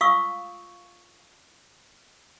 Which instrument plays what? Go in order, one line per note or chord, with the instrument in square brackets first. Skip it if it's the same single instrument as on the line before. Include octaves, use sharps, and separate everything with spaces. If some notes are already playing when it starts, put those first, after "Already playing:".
[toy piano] F4 F5 C#6 D#6 E6